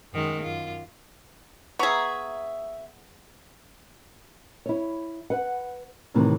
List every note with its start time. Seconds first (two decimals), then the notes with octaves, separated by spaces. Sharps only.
0.12 F#2 D#3 G#3
0.42 F#2 F4
1.79 B3 G#4 E5 A#5 C#6
4.66 E4 C#5
5.30 B4 F#5
6.14 A2 C3 D#3 E3 C4